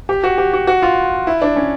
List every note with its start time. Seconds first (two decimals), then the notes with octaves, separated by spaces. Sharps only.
0.09 G4
0.24 F#4
0.38 G4
0.53 F#4
0.67 F#4
0.82 F4
1.27 E4
1.42 D4
1.56 C#4